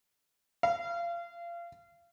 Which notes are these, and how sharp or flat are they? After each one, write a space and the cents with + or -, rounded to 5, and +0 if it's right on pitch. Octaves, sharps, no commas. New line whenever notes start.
F5 -30